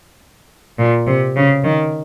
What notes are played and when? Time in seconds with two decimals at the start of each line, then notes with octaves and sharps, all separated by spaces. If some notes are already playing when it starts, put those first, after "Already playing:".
0.79 A#2
1.07 C3
1.37 C#3
1.64 D#3